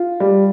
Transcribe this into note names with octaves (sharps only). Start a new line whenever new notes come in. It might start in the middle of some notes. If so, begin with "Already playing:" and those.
Already playing: F4
G3